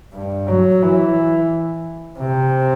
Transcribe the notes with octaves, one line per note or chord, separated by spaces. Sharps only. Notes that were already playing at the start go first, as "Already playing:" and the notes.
G2
F#3
E3
C3